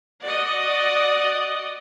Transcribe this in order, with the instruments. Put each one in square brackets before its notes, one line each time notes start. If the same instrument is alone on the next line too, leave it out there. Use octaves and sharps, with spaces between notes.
[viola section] F#4 D5 D#5